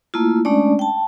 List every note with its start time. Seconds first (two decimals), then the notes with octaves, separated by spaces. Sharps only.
0.14 A3 A#3 E4 F4
0.45 G#3 A3 C#4 D4 D5
0.79 G5 A5